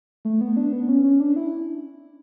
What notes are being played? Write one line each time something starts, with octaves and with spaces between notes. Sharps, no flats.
A3
B3
D4
B3
C#4
C#4
D4
E4